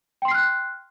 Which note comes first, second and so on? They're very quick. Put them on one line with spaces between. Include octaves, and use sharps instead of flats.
G5 C6 C7 F6 F#6